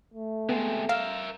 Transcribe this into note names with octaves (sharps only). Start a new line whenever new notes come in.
A3
C3 G#3 B3
A#4 E5 F5